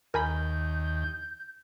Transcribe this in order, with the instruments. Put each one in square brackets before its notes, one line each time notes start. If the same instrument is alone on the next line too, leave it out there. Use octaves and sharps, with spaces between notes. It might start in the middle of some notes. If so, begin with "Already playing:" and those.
[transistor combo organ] D#2 [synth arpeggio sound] A#4 G#5 B5 [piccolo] G6